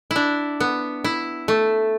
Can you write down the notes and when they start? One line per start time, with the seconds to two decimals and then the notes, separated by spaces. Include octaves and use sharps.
0.11 E4
0.16 D4
0.60 B3
1.04 E4
1.48 A3